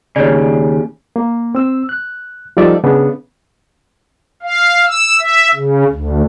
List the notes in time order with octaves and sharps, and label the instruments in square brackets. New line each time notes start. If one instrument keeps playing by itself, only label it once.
[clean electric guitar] D#2 C#3 [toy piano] C#5 D5
[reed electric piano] A#3
C4 E6
F#6
F3 G3 D#4 A4 D5 E5
C#3 B3 D4
[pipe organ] F5
E6
E5
C#3
D2